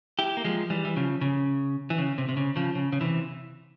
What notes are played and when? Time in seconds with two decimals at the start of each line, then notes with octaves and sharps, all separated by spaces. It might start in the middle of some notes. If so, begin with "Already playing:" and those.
0.19 E4 G4
0.37 A#3
0.44 F3 G#3
0.70 E3 G3
0.85 E3
0.96 C#3 F3
1.21 C#3
1.90 E3
1.98 C#3
2.18 C3
2.29 C3
2.37 C#3
2.56 C#3 F3
2.75 C#3
2.93 C#3
3.01 C3 E3